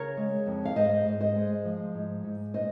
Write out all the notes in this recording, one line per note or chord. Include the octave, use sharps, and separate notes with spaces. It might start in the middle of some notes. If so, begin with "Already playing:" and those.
Already playing: C#3 A#4 C#5
G#3
F2
F5
G#2 C5 D#5
G#2
C5 D#5
G#3
F3
G#2
G#2
A#2 C5 D#5